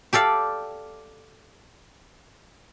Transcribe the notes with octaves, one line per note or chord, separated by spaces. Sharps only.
G4 A4 D5 F5